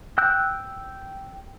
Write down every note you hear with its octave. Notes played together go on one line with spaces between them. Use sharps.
G5 E6 F#6 G6